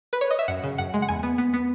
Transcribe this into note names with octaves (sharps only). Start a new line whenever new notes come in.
B4
C#5
D#5
E5
F#2 F#5
C#3
F#2 F#5
G#3
F#5
E2 G#5
B3
B3
B3